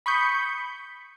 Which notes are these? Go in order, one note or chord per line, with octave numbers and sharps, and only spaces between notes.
B5 C#6 D#6 G6